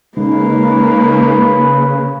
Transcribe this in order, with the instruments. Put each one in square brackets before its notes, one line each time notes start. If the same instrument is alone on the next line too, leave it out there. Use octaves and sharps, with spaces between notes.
[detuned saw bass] C#3 [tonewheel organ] G#3 D#4 [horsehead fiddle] A#3 [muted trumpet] B4